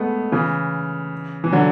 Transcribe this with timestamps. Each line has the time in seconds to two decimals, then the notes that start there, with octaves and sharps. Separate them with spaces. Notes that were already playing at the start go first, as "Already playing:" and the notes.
Already playing: G#3 A3 B3
0.32 C#3 E3
1.44 E3
1.53 D3 F#3